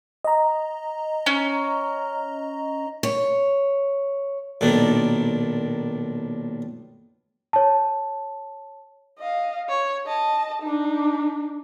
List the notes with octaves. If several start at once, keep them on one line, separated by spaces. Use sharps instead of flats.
D#5 A#5
C#4
C#5
B1 A#2 D#3 D4
C#5 A5
D#5 F5
C#5
D#5 A5
D4 D#4